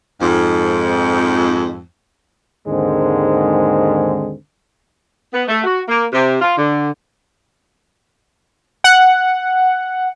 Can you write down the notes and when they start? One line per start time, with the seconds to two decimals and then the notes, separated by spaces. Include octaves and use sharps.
0.21 F2 G#2
2.67 D#2 G#2 D3 D#3 G#3 C4
5.32 B3
5.49 A3
5.64 F#4
5.88 A#3
6.13 C3
6.41 F4
6.57 D3
8.84 F#5